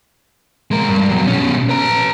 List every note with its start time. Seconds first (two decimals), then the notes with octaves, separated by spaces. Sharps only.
0.71 G#3 A#4
0.89 G2
1.09 B2 F#3
1.28 B2 C#4
1.69 B4 A#5